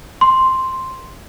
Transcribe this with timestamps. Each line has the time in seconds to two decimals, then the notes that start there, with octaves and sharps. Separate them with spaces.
0.21 C6